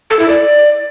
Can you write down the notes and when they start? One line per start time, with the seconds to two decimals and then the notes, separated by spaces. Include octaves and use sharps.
0.10 A4
0.19 E4
0.28 D5